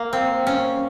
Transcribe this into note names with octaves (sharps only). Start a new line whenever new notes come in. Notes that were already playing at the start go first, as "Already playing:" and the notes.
Already playing: A#3
C4
C#4